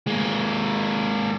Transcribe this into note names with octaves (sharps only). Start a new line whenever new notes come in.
G#3 A#3